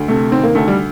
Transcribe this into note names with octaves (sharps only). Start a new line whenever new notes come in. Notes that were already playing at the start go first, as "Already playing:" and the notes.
Already playing: D2
C3 A3
D#3 C4
A#3
D2 A3
G3